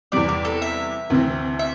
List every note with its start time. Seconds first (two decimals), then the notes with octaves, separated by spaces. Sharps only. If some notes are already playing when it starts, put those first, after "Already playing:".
0.12 E2 C3 G3 D5
0.29 D5
0.45 A4
0.62 E5
1.10 D2 C3 E3 C4
1.59 E5